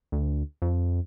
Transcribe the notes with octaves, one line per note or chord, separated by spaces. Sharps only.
D2
F2